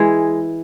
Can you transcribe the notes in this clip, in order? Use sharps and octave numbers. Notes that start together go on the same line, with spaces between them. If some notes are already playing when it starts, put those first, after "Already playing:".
Already playing: E3 G#3 G#4